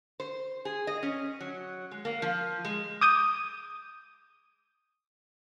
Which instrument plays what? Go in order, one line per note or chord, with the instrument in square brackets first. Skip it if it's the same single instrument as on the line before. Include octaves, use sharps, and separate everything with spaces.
[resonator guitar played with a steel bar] C5
G#4
D#5
C#4
F#3
G#3
A#3
F3
G#3
[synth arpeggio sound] D6 D#6 G6 D#7